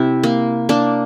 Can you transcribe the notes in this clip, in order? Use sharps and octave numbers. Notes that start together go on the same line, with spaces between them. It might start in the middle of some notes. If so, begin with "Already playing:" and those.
Already playing: C3 E4
A#3
A#3 D4